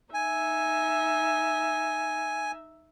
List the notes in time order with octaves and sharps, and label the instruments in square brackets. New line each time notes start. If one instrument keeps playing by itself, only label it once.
[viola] D#4 E5 [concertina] G#5